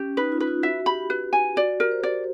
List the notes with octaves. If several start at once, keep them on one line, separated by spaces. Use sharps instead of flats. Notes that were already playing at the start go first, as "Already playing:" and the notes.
Already playing: C#4 G4
D#4 B4
F4
B4
F4
F#4 E5
G4 B5
B4
G#5
F#4 D5
G4 A#4
C5
D5